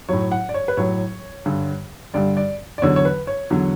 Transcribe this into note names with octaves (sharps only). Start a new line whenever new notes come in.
A2 F#3 C#5
F#5
D5
C#5
B4
A2 F#3 C#5
G2 D3 G3
G2 D3 G3 D5
D5
D5
E2 D3 F#3 C#5
C#5
B4
C#5
E2 D3 F#3